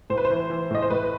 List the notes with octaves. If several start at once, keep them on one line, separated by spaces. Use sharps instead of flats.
A2 C5
B4
C5
E3
E3
A2 D#5
C5
A2 B4